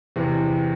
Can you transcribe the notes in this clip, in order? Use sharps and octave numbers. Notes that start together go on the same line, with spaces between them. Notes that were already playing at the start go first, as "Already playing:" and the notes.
E2 C3 E3